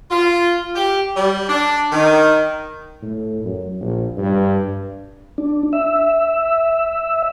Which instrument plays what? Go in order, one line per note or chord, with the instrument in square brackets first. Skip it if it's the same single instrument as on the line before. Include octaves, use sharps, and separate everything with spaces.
[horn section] F4
G4
G3
D4
D#3
[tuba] A2
F#2
A#1
G2
[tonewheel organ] D4
E5